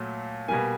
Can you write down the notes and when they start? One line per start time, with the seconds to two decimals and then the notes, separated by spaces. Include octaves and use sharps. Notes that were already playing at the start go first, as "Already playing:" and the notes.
Already playing: A#2 F#3 A3
0.48 B2 G3 A#3 G#5